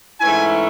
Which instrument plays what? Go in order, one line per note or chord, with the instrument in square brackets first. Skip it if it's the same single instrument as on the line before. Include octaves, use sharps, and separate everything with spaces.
[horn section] G#2 E3 A3 C#4 E4 G#5